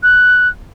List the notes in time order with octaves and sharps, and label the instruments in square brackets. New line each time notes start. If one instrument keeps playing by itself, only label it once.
[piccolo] F#6